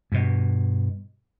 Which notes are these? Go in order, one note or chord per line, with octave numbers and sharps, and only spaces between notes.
G2 B2